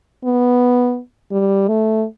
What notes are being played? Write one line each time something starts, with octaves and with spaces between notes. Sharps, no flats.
B3
G3
A3